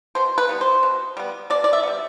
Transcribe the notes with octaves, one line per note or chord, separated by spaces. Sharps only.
B2 C5
B4
G3 B3
C5
B2
G3 B3
B2 D5
D5
E5
G3 B3